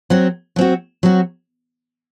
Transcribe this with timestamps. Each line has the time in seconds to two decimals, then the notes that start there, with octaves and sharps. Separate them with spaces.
0.10 F#3 C4 F#4
0.56 F#3 C4 F#4
1.03 F#3 C4 F#4